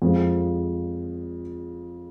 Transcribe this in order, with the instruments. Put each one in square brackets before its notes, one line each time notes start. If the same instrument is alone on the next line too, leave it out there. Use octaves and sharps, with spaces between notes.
[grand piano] F2 F3 G#3